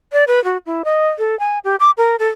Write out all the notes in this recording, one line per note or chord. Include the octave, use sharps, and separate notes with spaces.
D5
B4
F#4
E4
D#5
A4
G#5
G4
D6
A#4
A4